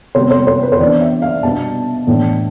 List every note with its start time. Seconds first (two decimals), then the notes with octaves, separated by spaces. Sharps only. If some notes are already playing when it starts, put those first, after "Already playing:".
0.15 C3 G3 B3 C5
0.31 C5
0.47 C5
0.63 B4
0.72 C5
0.79 E3 B3 D4 D5
1.01 E5
1.22 F5
1.43 B2 G3 B3 D4 A5
2.07 A2 E3 B3 D4